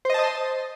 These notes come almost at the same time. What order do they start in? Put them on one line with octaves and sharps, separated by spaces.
C5 D#5 A5 D#6 C6